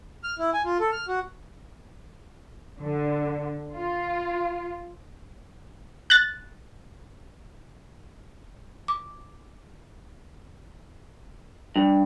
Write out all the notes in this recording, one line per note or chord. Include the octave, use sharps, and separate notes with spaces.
F6
E4
G#5
F4
A4
F6
F#4
D3
F4
F#6 A6
D6
G2